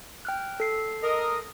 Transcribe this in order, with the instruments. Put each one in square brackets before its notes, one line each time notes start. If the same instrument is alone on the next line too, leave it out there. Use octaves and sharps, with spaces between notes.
[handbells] G5 F6 F#6
A4 C7
[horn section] A#4 D#5